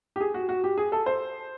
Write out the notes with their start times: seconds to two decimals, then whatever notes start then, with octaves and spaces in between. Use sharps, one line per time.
0.16 G4
0.20 G#4
0.34 F#4
0.49 F#4
0.64 G4
0.77 G#4
0.92 A4
1.06 C5